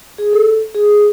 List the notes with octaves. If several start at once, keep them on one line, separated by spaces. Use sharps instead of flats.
G#4
A4
G#4